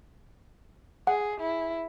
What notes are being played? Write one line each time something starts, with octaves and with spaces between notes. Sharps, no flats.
G#4 F#5
E4